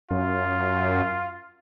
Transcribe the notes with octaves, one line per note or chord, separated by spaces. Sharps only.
F#2 F4